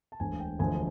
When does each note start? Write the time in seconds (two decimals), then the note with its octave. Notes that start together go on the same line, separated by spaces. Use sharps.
0.12 A5
0.20 E1 D2 D3 G#5
0.40 G5
0.59 E1 D2 D3 F3 G#5